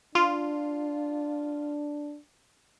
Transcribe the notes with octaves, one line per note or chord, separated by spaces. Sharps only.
D4 F4